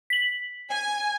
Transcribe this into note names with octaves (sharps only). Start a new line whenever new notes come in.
B6 F#7
G#5